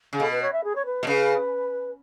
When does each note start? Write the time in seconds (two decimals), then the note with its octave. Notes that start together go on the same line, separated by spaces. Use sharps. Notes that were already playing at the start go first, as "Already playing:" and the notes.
0.13 C#3
0.20 B2 A4
0.31 B4
0.42 C#5
0.53 E5
0.64 G#4
0.75 C#5
0.85 B4
1.03 B2
1.06 C#3 B4